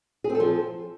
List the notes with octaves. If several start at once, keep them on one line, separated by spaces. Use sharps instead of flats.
G#4
C4
A4
F3